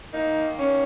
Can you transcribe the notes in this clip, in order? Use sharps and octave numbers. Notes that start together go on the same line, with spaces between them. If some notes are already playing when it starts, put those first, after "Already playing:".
D#3 A#3 D#4
C#4